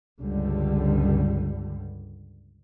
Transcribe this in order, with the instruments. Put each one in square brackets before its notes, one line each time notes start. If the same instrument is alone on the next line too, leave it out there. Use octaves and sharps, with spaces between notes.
[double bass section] C#2 G2 D3 G3